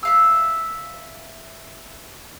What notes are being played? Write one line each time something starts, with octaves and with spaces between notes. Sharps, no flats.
E5 F5 E6